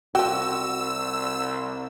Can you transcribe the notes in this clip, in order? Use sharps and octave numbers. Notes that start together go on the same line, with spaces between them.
C2 F3 F#4 G5 E6